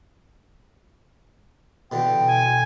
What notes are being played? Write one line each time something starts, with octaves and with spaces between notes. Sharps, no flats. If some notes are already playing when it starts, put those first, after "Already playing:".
B2 D3 E3 G5
G#5